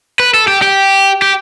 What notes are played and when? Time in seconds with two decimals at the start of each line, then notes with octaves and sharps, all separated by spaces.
0.20 B4
0.34 A4
0.48 G4
0.62 G4
1.22 G4